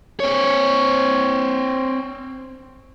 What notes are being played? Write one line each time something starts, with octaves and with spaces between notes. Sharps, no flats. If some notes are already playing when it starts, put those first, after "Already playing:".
C4 C#5